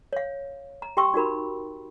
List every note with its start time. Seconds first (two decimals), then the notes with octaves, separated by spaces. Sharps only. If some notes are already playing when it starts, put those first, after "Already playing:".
0.13 C#5 F5
0.82 A#5
0.97 G4 G5 C6 C#6 E6
1.14 D#4 F#4 A#4 B5